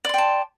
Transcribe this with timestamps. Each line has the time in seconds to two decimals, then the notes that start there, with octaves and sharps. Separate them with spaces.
0.05 D5
0.09 C6
0.14 G5
0.18 A5